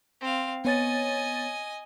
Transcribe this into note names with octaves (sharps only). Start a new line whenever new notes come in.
C4 F5
B3 C#5 D#5 G#5 A6